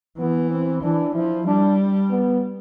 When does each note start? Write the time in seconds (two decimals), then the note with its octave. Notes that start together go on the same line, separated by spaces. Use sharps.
0.18 E3 B3
0.50 C4
0.83 E3 D4
1.15 F3 E4
1.46 G3 D4
2.10 B3